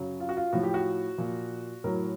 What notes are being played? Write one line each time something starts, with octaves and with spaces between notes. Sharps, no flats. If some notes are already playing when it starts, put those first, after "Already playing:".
Already playing: F#2 C#3 F#3
F4
F#4
F4
A2 F3 F#4
G4
F#4
A#2 F3
A2 F#3 A#4